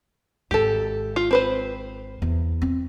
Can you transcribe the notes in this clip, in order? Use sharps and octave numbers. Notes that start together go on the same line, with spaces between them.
G#1 G#2 G4 A4
F4
C4 B4 C5
E2
C4